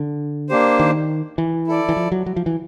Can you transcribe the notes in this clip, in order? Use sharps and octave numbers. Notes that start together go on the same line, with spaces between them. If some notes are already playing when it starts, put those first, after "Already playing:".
Already playing: D3
A#3 D4 G4 C5
D#3
E3
E4 A4 D5
E3
F3
F#3
F#3
F3
E3